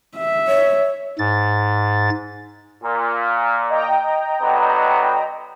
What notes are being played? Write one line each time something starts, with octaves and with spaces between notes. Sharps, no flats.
E5
C#5
G#2 A6
A#2
D#5 G5 A#5
D3 F#3 B3